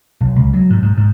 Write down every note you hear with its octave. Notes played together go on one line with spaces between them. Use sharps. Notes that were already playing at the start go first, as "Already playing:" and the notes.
B1
C#2
F#3
G#2
G#2
G#2